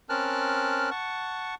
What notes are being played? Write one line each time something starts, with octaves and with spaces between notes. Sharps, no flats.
C4 C#4 A#4 A5 F6 F#6
F#5 A5 C#6